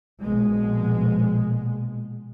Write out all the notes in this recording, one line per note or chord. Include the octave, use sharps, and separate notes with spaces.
A#1 B2 G#3